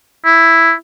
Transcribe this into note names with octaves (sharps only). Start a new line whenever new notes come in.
E4